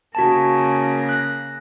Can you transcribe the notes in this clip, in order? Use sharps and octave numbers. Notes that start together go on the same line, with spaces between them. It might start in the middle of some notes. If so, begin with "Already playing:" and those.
C#3 A#3 F#4 A5
F#6 A#6